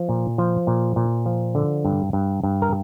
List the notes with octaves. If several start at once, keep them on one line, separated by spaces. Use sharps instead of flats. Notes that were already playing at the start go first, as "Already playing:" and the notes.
Already playing: F3
A#2
F3 C5
A#2
A#2
F3
D3
G2
G2
G2
A#4